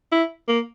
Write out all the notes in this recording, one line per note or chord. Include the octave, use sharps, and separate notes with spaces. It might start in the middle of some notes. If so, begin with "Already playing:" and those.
E4
A#3